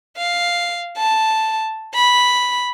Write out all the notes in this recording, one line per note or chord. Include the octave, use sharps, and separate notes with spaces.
F5
A5
B5